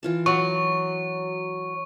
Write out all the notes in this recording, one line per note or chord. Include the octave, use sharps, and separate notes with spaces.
E3 F4 A5
F#3 F#5 C#6